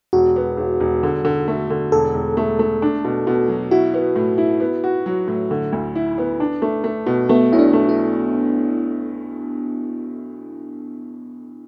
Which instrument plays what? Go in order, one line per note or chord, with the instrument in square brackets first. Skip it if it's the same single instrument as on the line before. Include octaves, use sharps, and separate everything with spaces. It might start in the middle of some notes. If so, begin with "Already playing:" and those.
[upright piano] E1 [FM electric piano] F#4
[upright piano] B3
E1
E1
D3
D3
A3
D3
[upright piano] E1 [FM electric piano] A4
[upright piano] E1
A3
A3
D4
B2
B2
F#3
[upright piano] E4 [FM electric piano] F#4
[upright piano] B3
A2
E4
B3
F#4
F#3
A2
D3
D2
E4
B3
D4
A3
A3
B2
[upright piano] A3 [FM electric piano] B3
[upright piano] B1 [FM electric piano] E4
[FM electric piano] D4
[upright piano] A3
[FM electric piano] E4